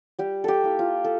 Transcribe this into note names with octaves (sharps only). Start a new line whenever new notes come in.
G3 G4
G4 A4
A#3 E4
F4
A4